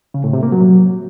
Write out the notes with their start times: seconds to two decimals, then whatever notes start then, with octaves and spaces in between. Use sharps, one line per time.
0.14 C#3
0.24 A2
0.33 C3
0.43 A#3
0.52 F#3